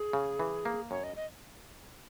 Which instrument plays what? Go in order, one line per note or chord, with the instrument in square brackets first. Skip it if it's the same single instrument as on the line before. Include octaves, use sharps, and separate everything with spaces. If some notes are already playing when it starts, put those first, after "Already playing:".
Already playing: [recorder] G#4
[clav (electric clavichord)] C#3
E3
A#3
[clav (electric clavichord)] F#2 [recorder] C#5
[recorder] D#5
D#5